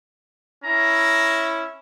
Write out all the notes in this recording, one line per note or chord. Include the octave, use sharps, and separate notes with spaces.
C#4 E4 A#5